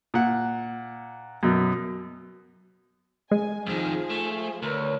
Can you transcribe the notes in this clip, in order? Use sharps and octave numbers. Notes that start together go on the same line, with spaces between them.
A#2 F#5
F#2 B2
G#3 G#5
F2 D#3 F3 G#4
A3
D2 A#4 B4 C#5